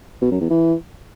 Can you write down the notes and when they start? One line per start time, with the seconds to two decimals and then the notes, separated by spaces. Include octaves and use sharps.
0.22 B2
0.31 F#2
0.41 E2
0.50 E3